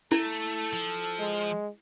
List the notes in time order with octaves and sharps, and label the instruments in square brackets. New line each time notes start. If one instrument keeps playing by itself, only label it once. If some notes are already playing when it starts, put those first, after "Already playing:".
[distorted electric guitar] A3 [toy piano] E4 [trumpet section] A4
[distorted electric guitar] F3
[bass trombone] G#3